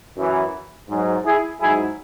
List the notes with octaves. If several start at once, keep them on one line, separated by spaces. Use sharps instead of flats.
F#2 E3
G#2 F#3
E4 G#4
G#2 F#3 E4 G#4